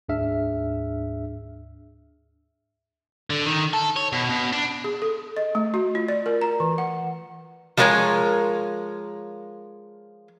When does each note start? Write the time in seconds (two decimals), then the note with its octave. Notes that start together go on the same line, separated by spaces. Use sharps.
0.09 D2 G#2 D4 G#4 E5 F6
3.30 D3
3.46 D#3
3.73 A4
3.96 C#5
4.13 B2
4.29 B2
4.53 D4
4.84 G#4
5.02 A4
5.37 D#5
5.55 A3
5.74 F#4
5.95 F4
6.08 D5
6.26 A#4
6.41 A#5
6.60 E3
6.78 F#5
7.77 F3 G3 G#3 A#4 C#5 G#5